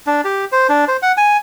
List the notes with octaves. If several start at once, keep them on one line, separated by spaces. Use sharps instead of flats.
D4
G4
C5
D4
C5
F#5
G#5